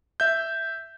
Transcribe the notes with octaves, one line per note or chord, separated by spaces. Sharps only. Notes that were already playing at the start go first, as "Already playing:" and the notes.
E5 G6